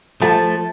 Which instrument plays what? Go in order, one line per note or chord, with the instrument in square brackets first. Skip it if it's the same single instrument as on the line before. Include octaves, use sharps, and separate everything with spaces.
[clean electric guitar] F3 A3 [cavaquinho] A5